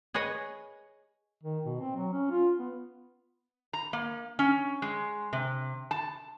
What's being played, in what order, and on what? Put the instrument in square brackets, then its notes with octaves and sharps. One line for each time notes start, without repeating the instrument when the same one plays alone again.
[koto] G#4 B4 C#5 D#5
[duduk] D#3
B2
C4
F#3
C#4
F4
B3
[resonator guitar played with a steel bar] A#5
A#3
C#4
G#3
C3
A5